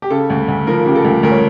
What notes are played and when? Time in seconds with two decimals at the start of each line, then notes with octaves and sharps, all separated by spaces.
0.02 G4
0.10 C#3 A4
0.30 D2
0.48 D2
0.67 F3 A#4
0.86 C#3 G4
0.96 A4
1.05 D2
1.23 D2 A#4
1.32 C#5